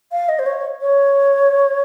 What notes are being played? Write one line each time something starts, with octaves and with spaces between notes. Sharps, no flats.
F5
D#5
C5
C#5
C#5